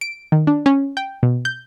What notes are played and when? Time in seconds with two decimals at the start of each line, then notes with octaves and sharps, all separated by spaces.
0.01 D7
0.32 D#3
0.47 D4
0.66 C#4
0.97 G5
1.23 B2
1.45 G6